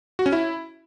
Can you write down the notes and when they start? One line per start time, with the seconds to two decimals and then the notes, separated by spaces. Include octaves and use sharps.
0.19 F#4
0.26 C#4
0.33 E4